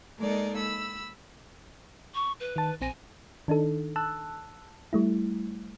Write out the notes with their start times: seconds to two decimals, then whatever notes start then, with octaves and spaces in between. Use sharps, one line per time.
0.19 G#3 A#3 D#4 A4 A#4 D5
0.57 B5 E6
2.14 C#6
2.40 B4
2.56 D#3 A5
2.81 A#1 C4 G#5 A#6
3.48 D#3 D4 D#4 A4
3.96 A5 E6 F#6
4.93 G3 A3 E4